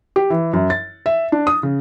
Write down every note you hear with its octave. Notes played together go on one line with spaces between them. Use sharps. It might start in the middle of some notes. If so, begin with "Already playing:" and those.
G4
E3
F#2
A6
E5
D4
D#6
C#3